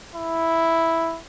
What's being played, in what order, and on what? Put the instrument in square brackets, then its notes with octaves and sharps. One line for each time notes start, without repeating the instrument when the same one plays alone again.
[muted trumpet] E4